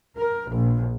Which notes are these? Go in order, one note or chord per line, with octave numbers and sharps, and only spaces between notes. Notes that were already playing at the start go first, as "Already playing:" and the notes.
A#4
A#1